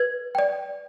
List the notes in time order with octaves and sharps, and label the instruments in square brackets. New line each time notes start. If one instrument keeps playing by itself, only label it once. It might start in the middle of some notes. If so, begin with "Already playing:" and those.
Already playing: [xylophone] B4 G#6
D5 G5